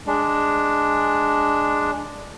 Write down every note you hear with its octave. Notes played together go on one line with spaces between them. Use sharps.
G#3 D4